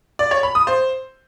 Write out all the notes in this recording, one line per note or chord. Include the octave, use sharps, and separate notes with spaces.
D5
C#5
B5
D#6
C5